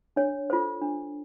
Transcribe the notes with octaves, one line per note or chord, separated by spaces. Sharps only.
D4 C#5
F4 A4 C5
D4